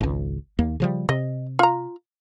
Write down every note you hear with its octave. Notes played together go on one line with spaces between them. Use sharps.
G#1 C#2
D#2 A#3
C#3 F3 G3
C3 D#5
F4 A#5